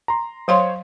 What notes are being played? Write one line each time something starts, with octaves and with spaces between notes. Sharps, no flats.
A#5 C6
F#3 C5 C#5 F5 C6